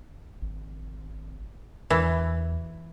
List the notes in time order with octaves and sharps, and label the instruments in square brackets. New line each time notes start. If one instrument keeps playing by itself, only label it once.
[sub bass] G#1
[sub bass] E2 [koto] E3